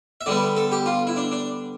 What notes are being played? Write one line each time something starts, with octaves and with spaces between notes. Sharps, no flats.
E5
D3 G3 B3 D5
A4
G4
F4
E4
D4
D4